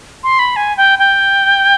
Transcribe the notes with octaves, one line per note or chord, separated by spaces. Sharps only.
C6
B5
G#5
G5
G5